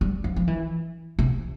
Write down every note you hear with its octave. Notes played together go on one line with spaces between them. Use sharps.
G3
F3
F3
E3
C3